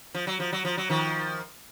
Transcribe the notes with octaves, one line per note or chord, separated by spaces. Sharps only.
F3
F#3
F3
F#3
F3
F#3
D#3 F3